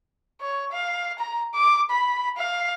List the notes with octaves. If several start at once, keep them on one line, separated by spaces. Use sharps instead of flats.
C#5
F5
A#5
D6
B5
F5